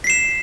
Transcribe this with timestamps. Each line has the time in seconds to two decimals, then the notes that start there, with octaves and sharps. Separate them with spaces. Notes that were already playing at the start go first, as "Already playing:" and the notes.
0.04 B6
0.07 C7
0.10 E7